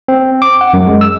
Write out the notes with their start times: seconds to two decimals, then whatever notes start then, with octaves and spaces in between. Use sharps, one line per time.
0.08 C4
0.42 D6
0.61 F#5
0.74 F#2
0.87 G#3
1.01 E6